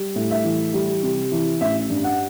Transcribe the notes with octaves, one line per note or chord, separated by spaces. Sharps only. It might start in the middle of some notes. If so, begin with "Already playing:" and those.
Already playing: G3
A2
E5
E3
G3
C3
E3
A1 E5
G2
F#5